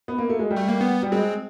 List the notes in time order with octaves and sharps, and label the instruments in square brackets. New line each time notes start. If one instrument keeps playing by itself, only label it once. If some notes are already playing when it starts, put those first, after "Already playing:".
[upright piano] B3
A#3
A3
G#3
G3
[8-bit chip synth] A3
A#3
B3
[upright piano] G3
[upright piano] G#3 [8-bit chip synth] C4